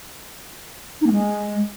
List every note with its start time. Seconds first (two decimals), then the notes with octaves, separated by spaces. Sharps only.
1.01 D#4
1.06 A#3
1.12 G#3